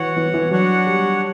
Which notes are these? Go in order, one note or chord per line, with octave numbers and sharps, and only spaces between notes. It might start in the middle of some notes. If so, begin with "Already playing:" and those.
Already playing: E3 F#4 C#5 F#5
E3
E3
F#3 D4 F#4 C#5 F#5
G3